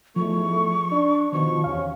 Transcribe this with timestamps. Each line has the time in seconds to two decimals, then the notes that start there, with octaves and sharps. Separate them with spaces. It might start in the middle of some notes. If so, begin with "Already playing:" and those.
0.16 E2 G#2 F3 A3 C#6
0.92 D4
1.32 B2 D#3 F3 C#6
1.64 E2 C3 C#4 F5